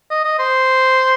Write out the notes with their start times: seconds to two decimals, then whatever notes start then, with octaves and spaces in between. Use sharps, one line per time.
0.11 D#5
0.25 D#5
0.39 C5